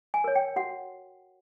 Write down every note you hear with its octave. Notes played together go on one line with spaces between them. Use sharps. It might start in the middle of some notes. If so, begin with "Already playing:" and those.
G#5
A#4 C#5
G5
F#4 F#5